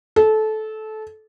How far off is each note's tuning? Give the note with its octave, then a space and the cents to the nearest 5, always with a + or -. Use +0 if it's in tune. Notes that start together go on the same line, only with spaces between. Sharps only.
A4 -20